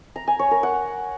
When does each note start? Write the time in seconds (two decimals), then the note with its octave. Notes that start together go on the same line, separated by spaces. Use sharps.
0.16 A#5
0.28 G#5
0.39 C#5
0.51 A#4
0.63 F#5